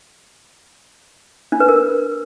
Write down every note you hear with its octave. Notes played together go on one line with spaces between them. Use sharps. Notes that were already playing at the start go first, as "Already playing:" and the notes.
D4
B4
A#4